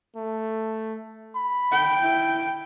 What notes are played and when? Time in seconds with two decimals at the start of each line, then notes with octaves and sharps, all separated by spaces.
0.16 A3
1.35 B5
1.72 G5
2.02 E4